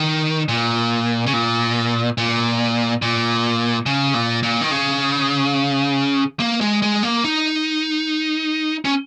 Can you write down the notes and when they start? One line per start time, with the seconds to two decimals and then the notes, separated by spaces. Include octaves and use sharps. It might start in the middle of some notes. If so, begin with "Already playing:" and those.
Already playing: D#3
0.48 A#2
1.26 C#3
1.33 A#2
2.18 A#2
3.02 A#2
3.86 C#3
4.14 A#2
4.43 A#2
4.61 D#3
4.71 C#3
6.40 A#3
6.61 G#3
6.82 G#3
7.03 A#3
7.24 D#4
8.85 C#4